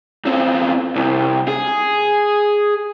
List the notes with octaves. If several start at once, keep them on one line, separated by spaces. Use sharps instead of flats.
E2 C4
C2
G#4